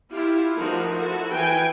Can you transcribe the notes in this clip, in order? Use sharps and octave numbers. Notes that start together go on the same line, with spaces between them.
E4 F4 G4
F3 A3 D#4 F#4 A#4
E4 F#4 A4
E3 G5 G#5